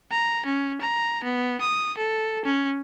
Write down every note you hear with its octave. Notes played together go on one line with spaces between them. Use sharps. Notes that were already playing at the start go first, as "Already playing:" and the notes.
A#5
C#4
A#5
B3
D#6
A4
C#4